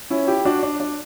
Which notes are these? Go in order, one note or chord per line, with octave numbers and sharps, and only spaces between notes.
C#4 E4
E4 G4
D4 F#4
D4
D4